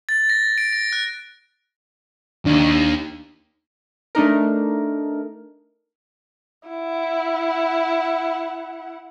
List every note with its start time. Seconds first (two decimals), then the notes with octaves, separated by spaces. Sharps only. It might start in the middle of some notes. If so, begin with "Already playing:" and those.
0.09 A6
0.30 A#6
0.58 D7
0.73 A#6
0.92 F#6
2.46 D#2 D4
4.15 A3 D4 D#4 A#4
6.68 E4 F#5